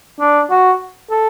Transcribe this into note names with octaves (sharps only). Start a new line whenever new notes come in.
D4
F#4
A4